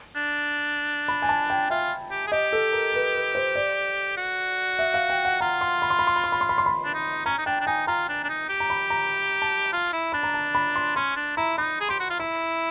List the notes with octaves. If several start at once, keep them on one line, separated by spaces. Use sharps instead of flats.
D4
B5
G#5
A5
G5
F4 E5
G4
G#4
G4 D#5
A4
A#4
B4
B4
C5
D5
F#4
E5
F5
G5
F#5
F4 A#5
C6
B5
C6
B5
C6
B5
C6
B5
C6
B5
C6
B5
D4
D#4
C#4 A#5
D#4
D4 G5
D4
D#4 G#5
F4 A#5
D4
D4
D#4
G4
A#5
B5
A#5
A5
F4
E4
D4 B5
A#5
A5
B5
C6
C#4 C6
D4
E4 A#5
D#4 B5
G#4
G4 C6
F#4
F4
E4 B5